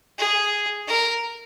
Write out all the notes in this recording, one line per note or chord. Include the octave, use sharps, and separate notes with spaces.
G#4
A#4